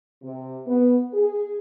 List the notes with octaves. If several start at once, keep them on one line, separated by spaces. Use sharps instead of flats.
C3
B3
G#4